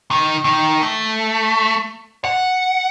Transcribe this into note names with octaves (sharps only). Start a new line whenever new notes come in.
D#3
D#3
A3
F#5